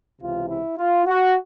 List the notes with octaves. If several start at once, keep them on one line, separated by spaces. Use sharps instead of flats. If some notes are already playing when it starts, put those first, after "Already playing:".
C#2 C3 E3 F4
E4
F4
F#4